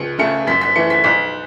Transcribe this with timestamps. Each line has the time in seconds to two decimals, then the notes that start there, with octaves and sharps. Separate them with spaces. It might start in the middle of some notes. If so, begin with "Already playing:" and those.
Already playing: C#2 C#7
0.18 C#3 A3 C#7
0.47 F#2 B6
0.61 B6
0.76 E3 A3 C#7
0.90 B6
1.04 B1 B6